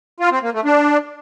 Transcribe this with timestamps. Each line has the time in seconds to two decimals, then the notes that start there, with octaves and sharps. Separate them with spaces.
0.20 F4
0.31 C4
0.43 A#3
0.54 A3
0.65 D4